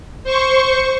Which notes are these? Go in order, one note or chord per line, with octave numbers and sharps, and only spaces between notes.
C5 C#6